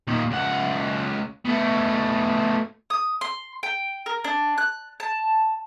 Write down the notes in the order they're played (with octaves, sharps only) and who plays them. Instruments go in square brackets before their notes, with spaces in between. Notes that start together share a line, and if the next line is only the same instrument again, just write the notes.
[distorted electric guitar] A#2 D#3
C#2 F#5
B2 A3
[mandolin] D#6
C6
G5
A#4
D4
F#6
A5